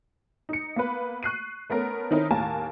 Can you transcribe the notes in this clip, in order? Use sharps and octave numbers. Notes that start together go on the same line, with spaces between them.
D#4 C#7
A#3 B3 B4
C#6 F#6 C7 D#7
A3 B3 C#4 A#4
D#3 C4 C#4 D#4 E4 A#4
D#2 A2 A#3 A#4 G#5 A5